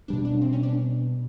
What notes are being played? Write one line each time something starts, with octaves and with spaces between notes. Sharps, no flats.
B2 G3 B3 D4
D4
C4
C#4
D4